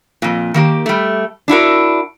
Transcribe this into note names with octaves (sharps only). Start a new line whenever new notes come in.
F2 A#2
D#3 A#3 G4
G3 A3
D4 E4 F#4 A#4